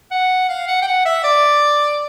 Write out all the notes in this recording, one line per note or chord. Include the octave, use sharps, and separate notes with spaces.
F#5
F5
F#5
G5
F#5
E5
D5